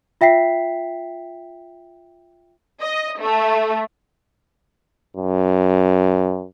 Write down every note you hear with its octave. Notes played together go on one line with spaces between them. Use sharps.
F4 E5 G5 B6 C7
D#5
A3
F#2